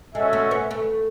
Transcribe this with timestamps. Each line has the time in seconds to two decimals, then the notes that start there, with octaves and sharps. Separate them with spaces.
0.14 G#3 C#4 F#4 A4 E5
0.33 A3
0.51 B3
0.71 A3